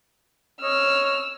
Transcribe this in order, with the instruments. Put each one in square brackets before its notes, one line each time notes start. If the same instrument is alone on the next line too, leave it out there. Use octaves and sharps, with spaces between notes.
[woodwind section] C#5 D#5 [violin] E6 F6